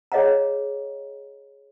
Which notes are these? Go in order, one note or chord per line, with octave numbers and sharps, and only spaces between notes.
G#4 C#5 D#5 F5 F#5 A#5